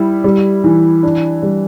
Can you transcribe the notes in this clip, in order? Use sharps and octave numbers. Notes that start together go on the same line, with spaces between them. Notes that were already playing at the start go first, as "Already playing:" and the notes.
Already playing: G3 E4
G3
E3
D4
G3